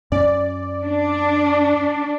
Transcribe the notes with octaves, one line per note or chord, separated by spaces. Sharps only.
F#2 C#4 D5
D4